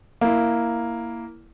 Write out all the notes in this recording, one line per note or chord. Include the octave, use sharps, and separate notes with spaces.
A#3 E4